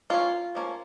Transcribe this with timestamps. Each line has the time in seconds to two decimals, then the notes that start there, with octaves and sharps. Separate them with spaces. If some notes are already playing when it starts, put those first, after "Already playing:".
0.10 F3 A#3 C#4 F4
0.55 F3 A#3 C#4